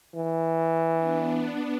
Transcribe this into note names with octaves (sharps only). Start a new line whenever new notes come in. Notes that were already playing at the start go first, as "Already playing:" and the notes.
E3
B3 D4